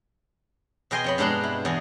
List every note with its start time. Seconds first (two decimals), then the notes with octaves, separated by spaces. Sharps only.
0.91 B2 G#4 D#5 G5 G#5 C6
1.04 F2 C#5 B5
1.18 G2 B2 G#3 D4 A#5 C6
1.43 E4
1.65 E2 G#4 D#5